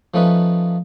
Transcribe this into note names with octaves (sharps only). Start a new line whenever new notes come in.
F3 A3 C#4 D#4 B4